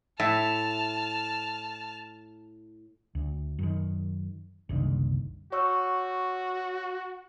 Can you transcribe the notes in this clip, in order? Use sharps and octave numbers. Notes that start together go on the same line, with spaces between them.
A2 E5 A5 F6
D2
F#2 D#3
F#1 C2 D3 D#3
F#4 C#5 C#6 E6